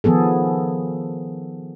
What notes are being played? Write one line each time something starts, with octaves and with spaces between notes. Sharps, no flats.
D#3 F3 B3 G#4 A4